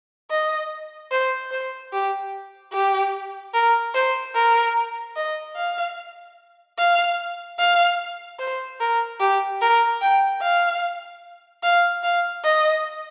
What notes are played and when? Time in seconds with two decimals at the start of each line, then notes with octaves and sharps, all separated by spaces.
0.31 D#5
1.11 C5
1.51 C5
1.93 G4
2.73 G4
3.54 A#4
3.94 C5
4.34 A#4
5.16 D#5
5.56 F5
6.78 F5
7.59 F5
8.39 C5
8.80 A#4
9.20 G4
9.61 A#4
10.01 G5
10.42 F5
11.63 F5
12.03 F5
12.44 D#5